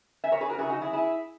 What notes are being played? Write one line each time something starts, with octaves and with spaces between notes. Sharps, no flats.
E5 G#5
A#4 C#5
G#4 B4
F#4 A#4
C#3 F#3 C#4 E4 G#4
D#4 F#4
E4 G#4
E4 G#4